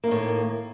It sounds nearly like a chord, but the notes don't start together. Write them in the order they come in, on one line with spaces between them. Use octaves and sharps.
A#3 D#3 A2